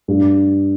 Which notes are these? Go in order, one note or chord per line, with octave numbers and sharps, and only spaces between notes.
G2